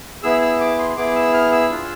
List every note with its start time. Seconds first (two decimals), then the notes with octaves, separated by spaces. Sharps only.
0.23 B3 E4 G#4 E6
0.42 E6
0.60 D6
0.79 C6
0.97 B3 E4 G#4 D6
1.16 E6
1.34 F6
1.52 E6
1.71 D4 F4 G#4